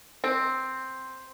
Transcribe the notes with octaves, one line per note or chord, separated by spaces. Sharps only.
C4